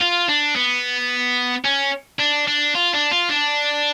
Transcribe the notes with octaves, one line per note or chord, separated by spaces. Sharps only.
F4
D4
B3
C#4
D4
D4
F4
D4
F4
D4